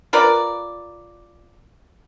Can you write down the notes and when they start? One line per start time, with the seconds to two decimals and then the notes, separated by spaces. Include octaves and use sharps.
0.13 F4 A#4 B4 D5